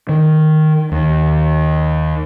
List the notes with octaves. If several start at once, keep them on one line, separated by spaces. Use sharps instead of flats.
D#3
D#2